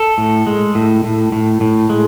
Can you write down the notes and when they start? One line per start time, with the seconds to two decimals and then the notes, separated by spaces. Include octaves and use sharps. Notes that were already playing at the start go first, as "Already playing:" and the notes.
Already playing: A4
0.18 A2
0.47 G#3
0.75 A2
1.04 A2
1.32 A2
1.61 A2
1.90 G#3